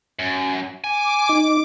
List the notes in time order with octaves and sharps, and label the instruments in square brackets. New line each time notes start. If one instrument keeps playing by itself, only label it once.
[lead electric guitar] F#2
[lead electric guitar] G#5 [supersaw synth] D6
[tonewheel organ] D#4